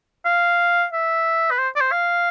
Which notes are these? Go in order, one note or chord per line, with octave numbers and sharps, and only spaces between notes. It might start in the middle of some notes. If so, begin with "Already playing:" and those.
F5
E5
B4
C5
D5
C5
F5